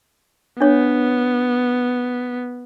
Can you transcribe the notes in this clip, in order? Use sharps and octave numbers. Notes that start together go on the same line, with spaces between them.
B3 D4 C#5